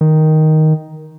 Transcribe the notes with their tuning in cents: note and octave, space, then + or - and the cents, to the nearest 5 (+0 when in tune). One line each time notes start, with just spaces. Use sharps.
D#3 +5